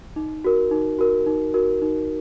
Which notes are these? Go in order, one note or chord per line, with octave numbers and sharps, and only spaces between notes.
D#4
F#4 A#4
D#4
F#4 A#4
D#4
F#4 A#4
D#4